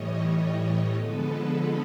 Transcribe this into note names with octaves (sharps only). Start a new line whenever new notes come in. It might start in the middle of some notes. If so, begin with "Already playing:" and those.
Already playing: A2 E3 G3 C#5 D#5
D3 F3 G#3 B3 A4 B4